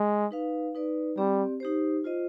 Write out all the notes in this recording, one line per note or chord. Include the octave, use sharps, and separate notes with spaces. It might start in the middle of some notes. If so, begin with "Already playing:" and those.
Already playing: G#3
D#4 B4 F5
D#4 B4 D5
G3 C4 G4 D5
D#4 G4 C5
F4 C5 D#5